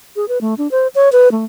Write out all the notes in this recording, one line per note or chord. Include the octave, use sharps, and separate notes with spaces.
G#4
B4
A3
D4
C5
C#5
B4
A3